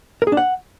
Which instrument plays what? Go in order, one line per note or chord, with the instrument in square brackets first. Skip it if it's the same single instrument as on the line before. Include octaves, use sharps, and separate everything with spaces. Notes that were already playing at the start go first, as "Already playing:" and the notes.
[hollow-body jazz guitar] A#4
G#4
D4
F#5